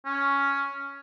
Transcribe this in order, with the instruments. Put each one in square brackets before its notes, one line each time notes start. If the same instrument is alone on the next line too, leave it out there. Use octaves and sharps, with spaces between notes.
[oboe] C#4